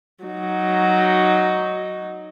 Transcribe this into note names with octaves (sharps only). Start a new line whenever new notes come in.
F#3 D#4